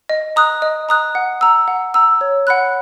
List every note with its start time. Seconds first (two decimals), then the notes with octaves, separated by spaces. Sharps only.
0.09 D#5
0.36 A#5 D#6 F#6
0.62 D#5
0.89 A#5 D#6 F#6
1.15 F#5
1.41 A#5 E6
1.68 F#5
1.94 A#5 E6
2.21 C#5
2.47 F#5 B5 F#6